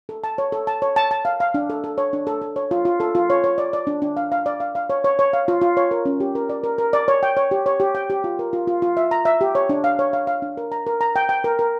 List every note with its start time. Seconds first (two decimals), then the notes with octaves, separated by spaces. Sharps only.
0.09 A4
0.24 A5
0.38 C#5
0.52 A4
0.67 A5
0.82 C#5
0.96 A5
1.11 A5
1.25 F5
1.40 F5
1.54 D4
1.70 A4
1.84 A4
1.98 C#5
2.13 D4
2.27 A4
2.41 A4
2.56 C#5
2.71 F4
2.85 F4
3.00 A4
3.15 F4
3.30 C#5
3.44 C#5
3.58 D5
3.73 D5
3.87 D4
4.02 D4
4.17 F5
4.32 F5
4.46 D5
4.60 F5
4.75 F5
4.90 C#5
5.04 C#5
5.19 C#5
5.33 F5
5.48 F4
5.61 F4
5.77 C#5
5.91 A#4
6.06 C#4
6.20 G4
6.35 A#4
6.49 D5
6.64 A#4
6.78 A#4
6.93 D5
7.08 C#5
7.23 G5
7.37 C#5
7.51 G4
7.66 C#5
7.80 G4
7.95 G5
8.10 G4
8.24 F4
8.39 A#4
8.53 F4
8.67 F4
8.82 F4
8.97 E5
9.11 A#5
9.25 E5
9.41 G4
9.55 C#5
9.69 D4
9.84 F5
9.99 C#5
10.13 F5
10.27 F5
10.42 D4
10.57 A#4
10.72 A#5
10.87 A#4
11.01 A#5
11.16 G5
11.29 G5
11.44 A#4
11.59 A#4